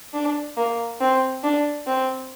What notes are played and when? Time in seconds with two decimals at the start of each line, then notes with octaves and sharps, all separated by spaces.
0.14 D4
0.57 A#3
1.00 C4
1.44 D4
1.87 C4